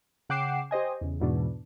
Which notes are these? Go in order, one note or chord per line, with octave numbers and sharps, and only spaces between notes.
C#3 F#5 G5 D6 C7 E7
G4 C5 D#5 G#5
E2 C#3
E2 G#2 B2 E3 D4